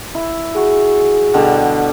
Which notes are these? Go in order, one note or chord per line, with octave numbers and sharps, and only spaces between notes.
E4
F#4 G#4
B2 D3 G3